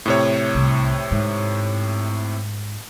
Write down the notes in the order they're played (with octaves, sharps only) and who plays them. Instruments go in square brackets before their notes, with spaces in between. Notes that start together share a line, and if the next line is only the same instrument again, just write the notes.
[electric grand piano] A2 C3 C#5
[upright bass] C2
G#2